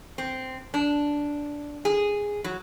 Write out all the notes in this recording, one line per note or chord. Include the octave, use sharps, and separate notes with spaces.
C4
D4
G#4
F#3